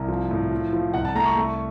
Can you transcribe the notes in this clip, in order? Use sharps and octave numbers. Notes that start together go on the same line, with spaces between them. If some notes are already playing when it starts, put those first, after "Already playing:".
Already playing: C2
F3
A2
F3
F3
C2 F#5
A5
A3 A#5
C#6
A3